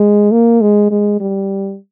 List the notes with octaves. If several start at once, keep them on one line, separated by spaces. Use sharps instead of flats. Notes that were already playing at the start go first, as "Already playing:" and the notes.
Already playing: G#3
A#3
G#3
G#3
G3